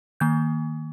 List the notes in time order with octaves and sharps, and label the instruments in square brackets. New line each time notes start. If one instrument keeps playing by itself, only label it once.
[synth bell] D#3 A#3 G6